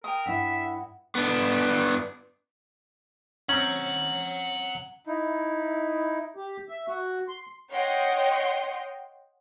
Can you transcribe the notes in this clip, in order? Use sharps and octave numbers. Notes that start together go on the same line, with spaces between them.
A#4 G5 D#6
G2 E4 E5 F#5
B3 D4
C4 C#4 F#5 A#5 F#7
D#4 E4
G4
E5
F#4
C6
C#5 D#5 F#5 G5 C6